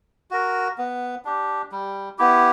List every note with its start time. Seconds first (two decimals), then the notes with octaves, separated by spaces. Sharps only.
0.31 F#4 A#4
0.78 B3
1.25 D4 G4
1.72 G3
2.18 B3 E4 G4